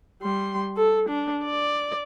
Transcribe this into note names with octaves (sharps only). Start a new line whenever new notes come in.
G3 C6
A4
D4
D5